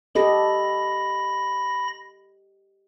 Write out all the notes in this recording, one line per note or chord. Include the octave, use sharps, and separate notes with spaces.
G4 A4 D#5 B5 A#6